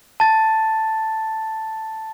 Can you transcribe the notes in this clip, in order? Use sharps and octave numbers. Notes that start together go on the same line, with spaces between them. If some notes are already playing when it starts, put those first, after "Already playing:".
A5 A6